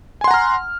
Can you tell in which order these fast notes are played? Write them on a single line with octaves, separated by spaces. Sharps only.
G#5 C6 F#5 A#5 F6